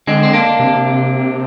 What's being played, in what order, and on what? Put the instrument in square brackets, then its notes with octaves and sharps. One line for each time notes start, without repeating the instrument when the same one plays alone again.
[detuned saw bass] D3 [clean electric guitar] G#3 C4
[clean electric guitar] C4
A#3 D4
[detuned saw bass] C3